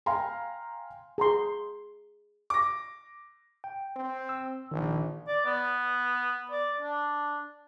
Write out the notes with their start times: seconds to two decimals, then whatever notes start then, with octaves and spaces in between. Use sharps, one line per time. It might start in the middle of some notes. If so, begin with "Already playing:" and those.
0.06 F5 G5 G#5 A#5 C6
1.18 G#4 A#5 C6
2.50 D6 A#6
3.64 G5
3.96 C4
4.29 E6
4.71 A#1 D#3
5.28 D5
5.45 B3
6.51 D5
6.81 D4